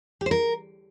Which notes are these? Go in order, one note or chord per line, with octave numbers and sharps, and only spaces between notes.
G4
C5
A#4